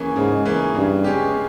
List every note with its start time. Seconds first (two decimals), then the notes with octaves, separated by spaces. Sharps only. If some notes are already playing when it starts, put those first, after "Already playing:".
Already playing: C#3 E3 A#3 C#4 G#4
0.16 G#2 C#3
0.45 E3 A#3 C#4 G#4
0.75 G2 C#3
1.04 G#3 C#4 G4
1.34 C#3